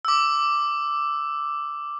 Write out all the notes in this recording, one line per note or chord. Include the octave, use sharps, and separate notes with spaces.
D6 E6